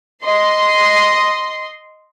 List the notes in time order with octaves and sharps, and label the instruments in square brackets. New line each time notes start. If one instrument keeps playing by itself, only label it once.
[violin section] D#5 C6